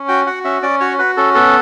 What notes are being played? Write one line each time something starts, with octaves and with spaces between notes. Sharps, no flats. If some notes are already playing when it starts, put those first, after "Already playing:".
Already playing: C#4
F#4 G5
F#4 F#5
C#4 E5
C#4 D5
F#4 C#5
F#4 B4
C#4 A4
B3 A4